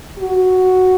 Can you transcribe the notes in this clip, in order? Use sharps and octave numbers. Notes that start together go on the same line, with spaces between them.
F#4